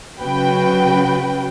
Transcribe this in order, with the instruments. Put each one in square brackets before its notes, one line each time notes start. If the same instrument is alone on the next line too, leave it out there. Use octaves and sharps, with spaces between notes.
[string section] C#3 F#3 F#4 B4 G5